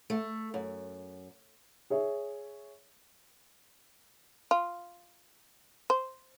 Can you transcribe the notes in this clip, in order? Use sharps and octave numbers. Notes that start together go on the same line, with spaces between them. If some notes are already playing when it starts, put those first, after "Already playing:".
A3
F#2
G#4 C#5 E5
F4
C5